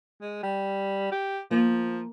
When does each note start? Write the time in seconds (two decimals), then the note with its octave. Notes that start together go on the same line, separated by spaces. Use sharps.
0.22 G#3
0.43 G3
1.12 G4
1.51 F3 A#3